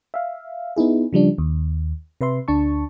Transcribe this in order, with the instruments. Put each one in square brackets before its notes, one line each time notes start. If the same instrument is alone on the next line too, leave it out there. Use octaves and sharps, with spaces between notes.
[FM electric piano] E5 F5
B3 D#4 E4 G#4
C#3 F3 G3 D4
D#2
C3 B4 E5 C6
D2 D4 A5 C#6